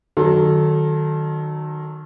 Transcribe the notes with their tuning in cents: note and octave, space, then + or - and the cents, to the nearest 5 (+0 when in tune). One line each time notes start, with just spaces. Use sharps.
D#3 -30 F#3 +0 A4 -10